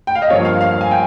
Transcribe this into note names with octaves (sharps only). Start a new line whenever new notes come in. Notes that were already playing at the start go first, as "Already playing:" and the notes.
G5
F5
D#5
G2 F3 A#3 C#5
F5
F5
F5
G#5
G5